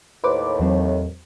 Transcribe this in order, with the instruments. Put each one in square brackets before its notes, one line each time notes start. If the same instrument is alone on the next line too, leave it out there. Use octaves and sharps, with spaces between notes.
[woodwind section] D#2 A2 [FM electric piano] B4 C5 D6
[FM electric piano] E2 F#3 C4